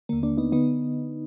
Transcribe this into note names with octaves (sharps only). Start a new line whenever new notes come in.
D#2 D3 A#3
A#3 D4
B3 D#4
D3 B3 D#4